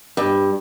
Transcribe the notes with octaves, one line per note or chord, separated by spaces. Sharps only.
G2